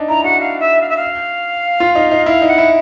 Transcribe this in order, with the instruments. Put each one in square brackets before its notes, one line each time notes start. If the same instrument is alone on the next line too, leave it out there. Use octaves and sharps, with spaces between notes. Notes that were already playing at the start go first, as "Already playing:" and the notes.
Already playing: [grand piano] D4 D#4
[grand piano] E4 [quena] A#5
[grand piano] F#4 [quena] F#5
[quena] F5
E5
F5
E5
F5
[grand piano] F4
D#4
D#4
[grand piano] E4 [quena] F5
[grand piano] D#4
[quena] F#5
[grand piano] E4